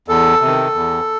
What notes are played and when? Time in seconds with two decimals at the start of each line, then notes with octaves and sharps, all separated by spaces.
0.08 E2 A4
0.41 C3
0.46 D#3
0.74 E2